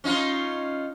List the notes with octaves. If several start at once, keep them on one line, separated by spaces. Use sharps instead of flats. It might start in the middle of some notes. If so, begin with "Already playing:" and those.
C#4 D#4 F4